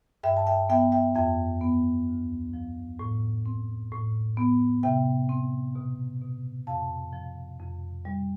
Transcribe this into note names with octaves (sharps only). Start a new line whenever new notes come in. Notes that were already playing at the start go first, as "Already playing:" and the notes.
G2 E5 G5
A5
E5 G5
B3 E5 G5
E5 G5
F2 E5 G5
B3
D2
F3
A2
C4
A2
B3
C3 E5 G5
C4
B2
B2
F2 F5 A5
F3
F2
G3